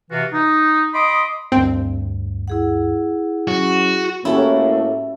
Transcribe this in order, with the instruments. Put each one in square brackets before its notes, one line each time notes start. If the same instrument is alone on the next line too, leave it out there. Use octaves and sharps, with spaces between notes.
[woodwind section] C3 E3 F4 F#4
D#4
D#5 B5 C6 D6 D#6
[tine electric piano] D2 G2 [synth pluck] C4
[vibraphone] E4 G#4 F#5
[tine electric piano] F#3 C#4 [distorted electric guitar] F#4
[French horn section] A2 A#3 [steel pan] C#4 F#4 G4 [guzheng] E4 A4